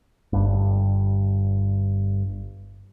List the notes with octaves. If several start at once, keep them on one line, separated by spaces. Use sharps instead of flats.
G1 G2